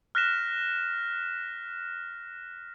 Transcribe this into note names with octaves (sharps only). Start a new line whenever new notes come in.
F6 F#6 A#6 B6 E7